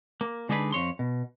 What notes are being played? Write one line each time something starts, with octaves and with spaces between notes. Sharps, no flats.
A#3
D3 G#3 D4 D#4 G#4 B4
F2 C#5 C6
B2